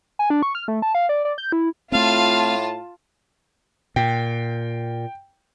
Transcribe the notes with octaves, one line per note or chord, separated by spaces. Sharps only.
G#5
D4
C#6
F6
A3
A5
F5
D5
D5
G6
E4
A2 A3 C4 F4 F5 A5
A#2 G5